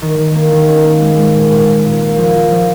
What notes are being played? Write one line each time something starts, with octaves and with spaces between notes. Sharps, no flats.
D#3
D#3
A#3
D#3
C#4
A#3
G#3
G#3
A#2
A#2
A#2
A#2
A#3
F3
F4
F3